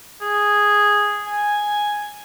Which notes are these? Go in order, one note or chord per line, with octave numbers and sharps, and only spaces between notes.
G#4
G#5